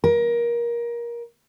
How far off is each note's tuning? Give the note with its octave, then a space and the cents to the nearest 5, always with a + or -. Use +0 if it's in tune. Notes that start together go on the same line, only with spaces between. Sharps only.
A#4 +20